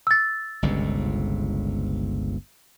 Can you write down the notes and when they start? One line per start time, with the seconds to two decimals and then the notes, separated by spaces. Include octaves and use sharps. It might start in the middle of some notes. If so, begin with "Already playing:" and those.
0.07 E6 A6
0.62 G1 C#2 C3